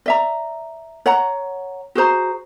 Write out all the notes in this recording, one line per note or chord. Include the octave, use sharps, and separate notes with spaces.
D5 E5 A#5
C#5 F#5 A#5
F#4 G#4 C5 A#5